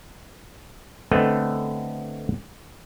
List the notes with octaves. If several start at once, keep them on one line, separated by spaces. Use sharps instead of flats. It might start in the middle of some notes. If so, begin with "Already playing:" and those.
D3 A3 B3 C4 A4 D#5